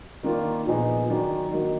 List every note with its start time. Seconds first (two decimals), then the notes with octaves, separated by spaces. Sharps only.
0.23 D#3 A#3 D4 F4
0.67 A#2 F3 B3 D#4 G#4
1.09 D#3 F#3 D4
1.52 D#3 A#3 D#4 F#4